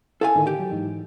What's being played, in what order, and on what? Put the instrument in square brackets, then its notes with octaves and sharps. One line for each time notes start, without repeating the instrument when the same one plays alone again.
[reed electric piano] E4 [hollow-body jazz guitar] A4 F5 G#5
[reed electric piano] A2 D3 D#3
[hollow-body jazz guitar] G4
[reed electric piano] F#3
G#2 E3 D#4